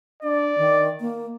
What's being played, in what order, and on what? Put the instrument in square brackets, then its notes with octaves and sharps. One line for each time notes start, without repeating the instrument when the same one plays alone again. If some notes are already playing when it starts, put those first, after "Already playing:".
[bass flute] D4 [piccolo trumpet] D5
[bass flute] D#3
A#3